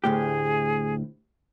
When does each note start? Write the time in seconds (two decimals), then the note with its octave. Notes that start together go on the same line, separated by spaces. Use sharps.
0.04 D2 A2 G4 G#4